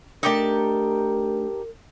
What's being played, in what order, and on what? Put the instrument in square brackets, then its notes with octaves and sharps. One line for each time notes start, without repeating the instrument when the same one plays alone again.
[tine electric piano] A3 D4 [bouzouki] D#4 G4 A5 [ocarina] A#4